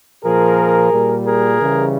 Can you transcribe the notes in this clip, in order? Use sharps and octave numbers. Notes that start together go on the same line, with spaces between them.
A#2 F3 G#4 A#4
A#2 G3
G#4 A#4
C#3 E3 G3